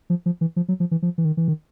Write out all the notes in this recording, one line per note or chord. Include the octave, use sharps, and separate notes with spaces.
F3
F3
E3
F3
F#3
F3
E3
F3
E3
D#3
E3
D#3